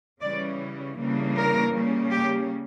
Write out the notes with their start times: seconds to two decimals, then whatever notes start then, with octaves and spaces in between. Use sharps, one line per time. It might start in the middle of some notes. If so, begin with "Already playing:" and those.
0.20 C#3 E3 G3 C#4 D5
0.97 C#3 E3 G3 A#3 D4
1.35 A#4
1.72 C#3 G3 A#3 C#4
2.10 G4